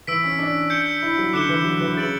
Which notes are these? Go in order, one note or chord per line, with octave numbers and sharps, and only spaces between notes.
E3 E6 B6 D7
C#4
D4
G6 C#7 G7
E4
F#3
D3 D6 F#6 C#7 E7 G7
E3
F#3
E3
C#3 E6 A6 D7 F#7